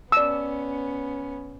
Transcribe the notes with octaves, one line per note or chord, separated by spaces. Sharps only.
B3 C#4 D5 E6